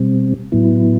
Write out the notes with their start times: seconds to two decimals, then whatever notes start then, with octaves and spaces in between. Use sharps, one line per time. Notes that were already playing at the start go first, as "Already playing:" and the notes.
Already playing: B2 G3 C4
0.52 A2 F#3 B3 E4